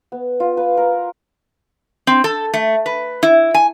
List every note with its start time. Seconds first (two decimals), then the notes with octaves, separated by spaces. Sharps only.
0.12 B3
0.40 F4
0.57 B4
0.77 A#4
2.07 C4
2.24 A4
2.54 A3
2.86 B4
3.23 E4
3.54 G#5